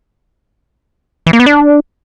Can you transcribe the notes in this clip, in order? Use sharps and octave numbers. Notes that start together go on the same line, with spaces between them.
E3
A#3
B3
D4